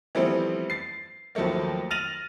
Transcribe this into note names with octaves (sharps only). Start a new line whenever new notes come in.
E3 F3 G3 A3 B3 C4
A6 C7
D#2 F3 F#3 A3 A#3
F6 A6 A#6 D#7 F7 F#7